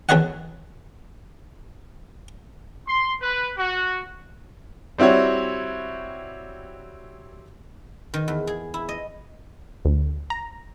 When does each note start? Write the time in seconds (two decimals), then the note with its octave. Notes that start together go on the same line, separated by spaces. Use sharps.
0.09 E2 A4 B4 C#5 D#5 F#5
2.88 C6
3.21 B4
3.57 F#4
4.98 G3 C4 E4 F#4 C#5
8.14 D#3
8.28 E2
8.47 G#4
8.74 E4
8.89 D#5
9.85 D2
10.30 A#5